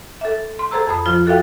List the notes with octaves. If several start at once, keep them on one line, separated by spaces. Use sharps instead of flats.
A4 E5
C6
G#4 A4 C5 A#5 E6
F2 B5 D#6
F3 F4 C5
F#4 A4 E5 F5 G5